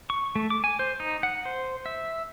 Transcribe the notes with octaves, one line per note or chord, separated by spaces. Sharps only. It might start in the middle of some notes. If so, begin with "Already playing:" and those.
C#6
A3
D6
G#5
C5
D#4
F#5
C5
E5